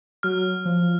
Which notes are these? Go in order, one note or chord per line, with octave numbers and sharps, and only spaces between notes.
F#3 F6
F3